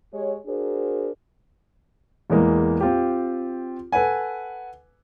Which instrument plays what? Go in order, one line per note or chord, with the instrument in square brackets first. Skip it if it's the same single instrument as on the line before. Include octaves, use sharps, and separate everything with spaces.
[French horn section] G#3 G4 C#5
D4 F#4 G#4 A#4 C5
[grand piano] E2 E3 G#3 A#3
C4 F4 G4
A4 B4 F#5 G#5